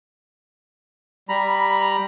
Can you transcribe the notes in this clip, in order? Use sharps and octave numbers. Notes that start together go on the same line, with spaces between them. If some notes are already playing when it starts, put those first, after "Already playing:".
G3 A#5 B5